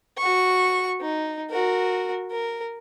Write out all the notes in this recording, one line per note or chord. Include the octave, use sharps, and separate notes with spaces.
F#4 C#6
D#4
F#4 A#4
A#4